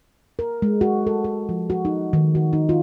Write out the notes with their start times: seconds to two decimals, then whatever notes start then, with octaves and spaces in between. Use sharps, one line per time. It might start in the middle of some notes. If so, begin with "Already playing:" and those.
0.39 A#4
0.62 G#3
0.81 F#4
1.07 A4
1.24 A4
1.49 F3
1.70 F#4
1.85 D#4
2.13 D#3
2.35 F#4
2.53 D#4
2.69 F4